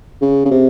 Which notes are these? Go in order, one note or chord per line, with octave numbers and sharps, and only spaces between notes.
C#3
C#3
C3